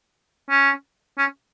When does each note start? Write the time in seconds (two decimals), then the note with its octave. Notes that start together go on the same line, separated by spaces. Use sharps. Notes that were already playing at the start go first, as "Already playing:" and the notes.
0.50 C#4
1.18 C#4